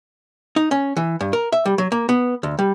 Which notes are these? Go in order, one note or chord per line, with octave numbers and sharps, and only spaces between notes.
D#4
C#4
E3
G2
A#4
E5
G3
F#3
A#3
B3
D2
G3